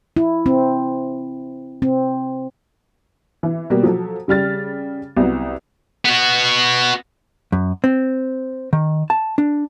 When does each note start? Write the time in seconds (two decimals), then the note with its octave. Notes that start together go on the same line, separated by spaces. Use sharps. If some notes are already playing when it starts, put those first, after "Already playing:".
0.17 E4
0.46 C4
1.82 C4
3.43 E3
3.70 B2 G3 A#3
3.83 F3 F#3 A4
4.28 C#3 G3 F6 A6
5.17 C2 F#3 B3
6.05 B3 F#4
7.52 F#2
7.84 C4
8.73 D#3
9.10 A5
9.38 D4